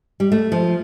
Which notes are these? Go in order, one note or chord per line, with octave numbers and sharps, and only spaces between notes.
G3
A3
F3